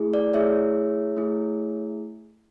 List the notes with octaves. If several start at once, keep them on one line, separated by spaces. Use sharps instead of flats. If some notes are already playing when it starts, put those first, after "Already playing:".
Already playing: A3 E4 G#4
D5
A3 E4 G#4 C#5 E5
A3 E4 G#4